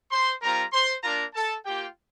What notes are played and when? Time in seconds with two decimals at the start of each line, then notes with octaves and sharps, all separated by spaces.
0.11 C5 C6
0.42 G3 C4 F4 A#4 A#5
0.72 C5 C6
1.03 A#3 D4 F4 A#4 A#5
1.34 A4 A5
1.65 A#3 F4 G4 G5